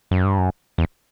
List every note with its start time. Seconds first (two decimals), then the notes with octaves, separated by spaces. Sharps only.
0.11 F#2
0.25 G2
0.38 F#2
0.78 E2